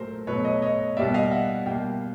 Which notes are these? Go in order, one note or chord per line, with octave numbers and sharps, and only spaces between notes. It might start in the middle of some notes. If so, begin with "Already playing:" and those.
Already playing: A#2 F#3 A3 A#4 C5
B2 F#3 A3 B4 C#5
C#5 D#5
C#5 D#5
B2 G3 A#3 D5 E5
D#5 F5
E5 F#5
B2 G3 A#3 F5 G5